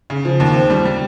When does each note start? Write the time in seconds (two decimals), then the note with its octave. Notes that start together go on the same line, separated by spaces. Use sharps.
0.10 C#3
0.25 F3
0.40 D#2
0.55 C4
0.70 G3
0.85 G3